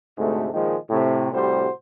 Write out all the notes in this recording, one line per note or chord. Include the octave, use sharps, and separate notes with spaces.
D2 G#2 C3 A3
A#2 D#3 F3 G#3
A2 C3
A2 C3 G3 F#4 C5